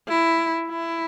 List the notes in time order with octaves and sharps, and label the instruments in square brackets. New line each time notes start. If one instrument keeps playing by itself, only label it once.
[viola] E4
E4